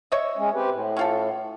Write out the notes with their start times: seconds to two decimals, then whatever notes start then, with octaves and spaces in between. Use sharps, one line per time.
0.12 C#5 D#5 E5
0.37 G#3 C#4
0.54 C4 G4 B4
0.70 A2
0.97 C#4 F4 A4